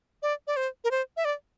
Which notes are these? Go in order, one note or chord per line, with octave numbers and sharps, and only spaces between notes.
D5
D5
C5
A#4
C5
E5
D5